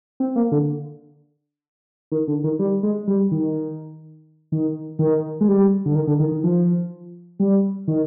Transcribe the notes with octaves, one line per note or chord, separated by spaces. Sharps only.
C4
A#3
D3
D#3
D3
D#3
G3
G#3
G3
D#3
D#3
D#3
G#3
G3
D3
D#3
D3
D#3
D#3
F3
G3
D#3